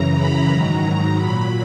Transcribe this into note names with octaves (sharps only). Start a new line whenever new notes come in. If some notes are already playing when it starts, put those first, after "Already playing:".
Already playing: F#2 C#3 E3 A#5
B5
G#2 D#3 F#3 A#5
A#2 F#3 B5